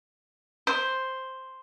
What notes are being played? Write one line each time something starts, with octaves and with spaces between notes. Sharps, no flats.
C5